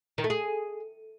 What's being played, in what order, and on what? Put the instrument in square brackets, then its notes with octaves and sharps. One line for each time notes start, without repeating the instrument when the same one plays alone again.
[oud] D#3
A3
G#4